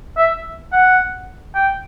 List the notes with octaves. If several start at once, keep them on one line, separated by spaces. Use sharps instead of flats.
E5
F#5
G5